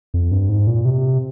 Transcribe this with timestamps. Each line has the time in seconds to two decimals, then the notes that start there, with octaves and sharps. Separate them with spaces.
0.14 F2
0.31 G2
0.49 G#2
0.67 A#2
0.85 C3